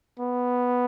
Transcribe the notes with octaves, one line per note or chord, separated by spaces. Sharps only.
B3